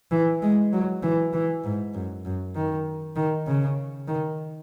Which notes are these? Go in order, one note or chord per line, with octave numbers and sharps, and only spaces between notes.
E3
G#3
F#3
E3
E3
G#2
F#2
F#2
D#3
D#3
C#3
D#3